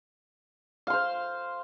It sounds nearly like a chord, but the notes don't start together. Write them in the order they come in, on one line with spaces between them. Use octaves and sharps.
F5 C6 C5